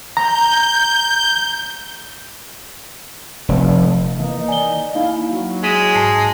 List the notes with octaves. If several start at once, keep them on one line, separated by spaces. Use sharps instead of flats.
A#5 G6
F1
D#3 E3 A#3 D#4
D5 G#5 G7
A#3 D#4 E4 F5
F#3
G#3 B6 D#7 E7
G#2 A5 C7